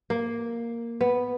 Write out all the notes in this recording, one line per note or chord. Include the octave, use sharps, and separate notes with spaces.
A#3
B3